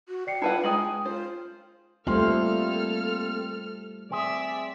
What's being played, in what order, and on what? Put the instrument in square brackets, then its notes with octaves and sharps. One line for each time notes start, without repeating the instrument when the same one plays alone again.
[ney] F#4
[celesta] D5 C7 C#7 [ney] G5
[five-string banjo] E4 B4 F#5 [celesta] F4 A5
[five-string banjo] G#3 D#4 G#5 [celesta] D#6 F#7
[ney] F4 [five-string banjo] C5
[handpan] G3 A3 C5 [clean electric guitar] A#3 C4 [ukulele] F4 [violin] A4 F6
[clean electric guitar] C4 G#4 [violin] D5 E5